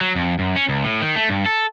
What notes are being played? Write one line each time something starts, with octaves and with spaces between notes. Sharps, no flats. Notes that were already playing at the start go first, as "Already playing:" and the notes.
F#3
F2
F#2
C#4
C#2
A2
D#3
A3
G2
A4